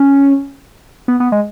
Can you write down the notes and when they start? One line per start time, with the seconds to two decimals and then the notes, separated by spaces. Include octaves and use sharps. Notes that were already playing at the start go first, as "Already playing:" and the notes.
Already playing: C#4
1.08 B3
1.20 B3
1.32 G#3